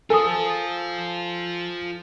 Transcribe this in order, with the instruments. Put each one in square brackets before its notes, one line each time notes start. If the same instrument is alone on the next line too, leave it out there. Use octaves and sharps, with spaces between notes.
[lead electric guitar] F4 C5 [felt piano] A4 [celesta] G#5 D#6